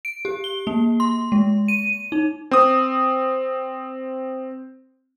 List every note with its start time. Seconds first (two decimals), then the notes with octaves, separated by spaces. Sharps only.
0.05 D7
0.25 G4
0.44 G7
0.67 A#3
1.00 C6
1.32 G#3
1.68 D#7
2.12 D#4
2.51 C4 D#6